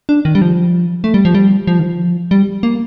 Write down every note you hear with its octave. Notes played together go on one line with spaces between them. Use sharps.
D4
D#3
G3
F3
A3
G3
F3
G3
F3
D#3
F3
G3
A#3